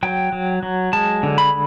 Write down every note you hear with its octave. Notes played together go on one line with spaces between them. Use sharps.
F#3 G5
F#3
F#3
G#3 A5
D3
B5